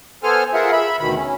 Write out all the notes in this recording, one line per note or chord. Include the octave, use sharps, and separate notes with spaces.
B3 A4 C5 G#5 F6
F4 G#4 A#4 E5 F#5
E5 B5
D2 B2 D#3 B5
C#4